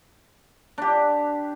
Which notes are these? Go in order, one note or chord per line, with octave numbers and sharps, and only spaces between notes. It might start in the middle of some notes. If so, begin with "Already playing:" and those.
D4 G4